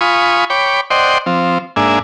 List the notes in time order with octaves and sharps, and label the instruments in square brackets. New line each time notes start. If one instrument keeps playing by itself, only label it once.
[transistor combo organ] F4 G#5 B5 C#6 D#6
C#5 G5 B5 D6
C5 D5 D#5 F#5 G5 C6
F3 C4
G#2 A#3 D4 E5 G#5